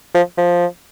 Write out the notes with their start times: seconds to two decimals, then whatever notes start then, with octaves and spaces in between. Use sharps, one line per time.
0.14 F3
0.38 F3